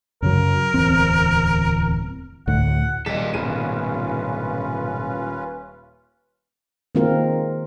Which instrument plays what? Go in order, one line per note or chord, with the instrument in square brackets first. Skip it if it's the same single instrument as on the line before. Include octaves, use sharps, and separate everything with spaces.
[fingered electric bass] F#2 C#3 F#3 [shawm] A#4
[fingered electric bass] D1 E2 C4
[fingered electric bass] D2 A2 [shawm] F#5
[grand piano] D#1 B6 E7 [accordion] A#2 G3 [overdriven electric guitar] A4 D#5
[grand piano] D#1 D#7 [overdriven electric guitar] G#2 B2 [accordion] C#4 F4 B4
[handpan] D#3 G#3 A#3 C4 F4 A#4